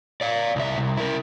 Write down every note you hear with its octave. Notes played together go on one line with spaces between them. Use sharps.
D5 F5
C2 E5
C2
E4 A#4